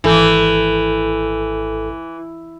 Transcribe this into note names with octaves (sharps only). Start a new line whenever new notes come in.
G#1 E3 A4 G6